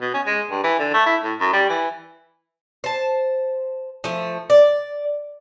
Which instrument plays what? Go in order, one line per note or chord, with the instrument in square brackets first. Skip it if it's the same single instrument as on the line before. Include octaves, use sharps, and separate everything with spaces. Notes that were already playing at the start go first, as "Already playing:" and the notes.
[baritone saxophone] B2
C#4
G#3
G2
E3
D3
A3
E4
A2
F#2
G3
E3
[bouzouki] C5 A5
F3 A3
D5